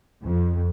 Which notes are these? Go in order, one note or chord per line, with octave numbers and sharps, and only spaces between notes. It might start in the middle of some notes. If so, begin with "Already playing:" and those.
F2